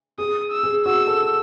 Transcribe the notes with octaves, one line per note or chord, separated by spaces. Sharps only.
G#4 D#6
E6
G#4
F#4 E6
A4